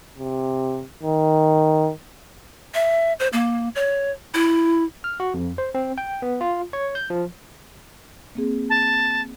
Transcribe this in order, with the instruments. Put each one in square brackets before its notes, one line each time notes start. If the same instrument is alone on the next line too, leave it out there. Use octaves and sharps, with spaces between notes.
[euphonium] C3
D#3
[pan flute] E5
C5
A#3
C#5
E4
[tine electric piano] F6
F#4
F2
C5
C4
G5
B3
F4
C#5
G6
F3
[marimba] A#3 C4 G#4
[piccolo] A5